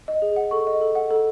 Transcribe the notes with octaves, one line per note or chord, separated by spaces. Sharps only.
D#5
G#4
F#5
A4 C#6
D#5
A4
F#5
A4